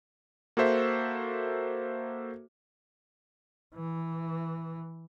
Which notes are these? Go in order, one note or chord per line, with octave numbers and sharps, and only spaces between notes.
A#3 F#4 A4 C5 E5
E3